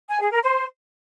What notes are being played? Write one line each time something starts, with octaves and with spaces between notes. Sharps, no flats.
G#5
G#4
A#4
C5